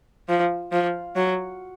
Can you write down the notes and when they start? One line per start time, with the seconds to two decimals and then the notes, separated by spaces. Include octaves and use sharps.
0.29 F3
0.72 F3
1.16 F#3